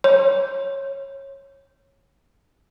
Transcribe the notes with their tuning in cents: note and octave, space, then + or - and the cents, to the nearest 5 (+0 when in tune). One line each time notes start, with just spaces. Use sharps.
C#5 -15